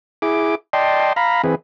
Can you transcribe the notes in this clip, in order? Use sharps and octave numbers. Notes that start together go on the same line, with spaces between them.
E4 G#4 D6
D5 D#5 G5 A5 C6
F5 A#5 B5
E3 C4 G#4 B4